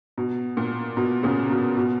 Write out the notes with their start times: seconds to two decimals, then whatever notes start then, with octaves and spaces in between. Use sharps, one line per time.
0.18 B2
0.57 A#2
0.97 B2
1.23 A#2 C#3
1.50 B2
1.77 B2